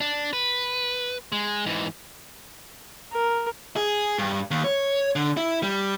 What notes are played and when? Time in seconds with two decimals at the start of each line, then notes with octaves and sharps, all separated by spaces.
0.01 D4
0.33 B4
1.32 G#3
1.66 G#2 E3
3.12 A#4
3.77 G#4
4.18 G2
4.51 D#2
4.64 C#5
5.16 D3
5.37 E4
5.63 G3